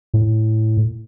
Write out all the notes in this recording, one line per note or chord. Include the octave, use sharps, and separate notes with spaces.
A2